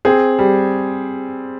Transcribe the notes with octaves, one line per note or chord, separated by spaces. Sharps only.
C4 G#4
G3